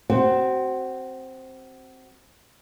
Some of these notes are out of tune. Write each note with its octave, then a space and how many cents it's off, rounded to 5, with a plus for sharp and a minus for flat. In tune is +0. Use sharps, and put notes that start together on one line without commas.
C4 +5 F#4 +30